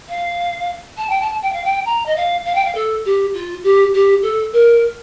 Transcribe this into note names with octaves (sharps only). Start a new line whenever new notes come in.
F5
A5
G5
A5
G5
F5
G5
A#5
D#5
F5
F5
G5
F5
A4
G4
F4
G4
G4
A4
A#4